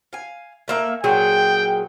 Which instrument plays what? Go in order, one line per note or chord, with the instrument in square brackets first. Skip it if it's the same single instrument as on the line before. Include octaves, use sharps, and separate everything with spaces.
[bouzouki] F5 G#5
A3 A#3 E5
[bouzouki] A#2 F#3 G#4 [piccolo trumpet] G5